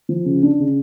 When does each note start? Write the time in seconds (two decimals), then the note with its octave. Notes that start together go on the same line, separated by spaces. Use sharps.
0.09 F3
0.26 C#3
0.43 D4
0.60 C#3